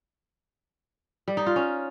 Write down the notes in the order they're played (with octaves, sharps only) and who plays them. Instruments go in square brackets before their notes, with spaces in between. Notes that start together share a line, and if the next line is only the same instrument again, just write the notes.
[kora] G3
D#4
F4
C#4